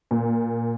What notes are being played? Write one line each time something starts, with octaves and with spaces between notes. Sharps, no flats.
A#2